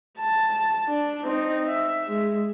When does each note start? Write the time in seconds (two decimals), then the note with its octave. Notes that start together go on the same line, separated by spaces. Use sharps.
0.19 A5
0.88 D4
1.24 C4 D#4
1.68 E5
2.08 G#3